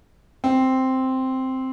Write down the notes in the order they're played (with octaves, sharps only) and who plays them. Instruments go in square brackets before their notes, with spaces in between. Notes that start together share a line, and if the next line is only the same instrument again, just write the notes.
[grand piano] C4